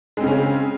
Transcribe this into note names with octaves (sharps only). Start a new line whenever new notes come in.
C#3 G#3 C4 C#4